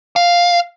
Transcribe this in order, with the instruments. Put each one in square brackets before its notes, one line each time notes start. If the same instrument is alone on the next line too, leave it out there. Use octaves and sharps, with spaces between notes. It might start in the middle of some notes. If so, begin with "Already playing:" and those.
[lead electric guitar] F5